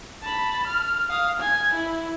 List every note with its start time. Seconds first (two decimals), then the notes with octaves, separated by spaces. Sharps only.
0.23 A5 B5
0.67 F6
1.09 F5 D#6
1.40 G#5
1.74 E4